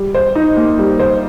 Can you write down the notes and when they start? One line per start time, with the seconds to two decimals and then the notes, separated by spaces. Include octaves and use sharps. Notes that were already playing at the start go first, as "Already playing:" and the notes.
Already playing: G3
0.15 C5
0.35 D#4
0.57 A#3
0.79 G3
0.99 C5